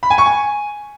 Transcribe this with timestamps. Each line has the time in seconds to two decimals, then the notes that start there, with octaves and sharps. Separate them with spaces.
0.03 B5
0.10 G#5
0.18 C#6
0.26 G#5